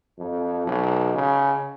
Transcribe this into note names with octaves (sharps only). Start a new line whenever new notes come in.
F2
B1
C#3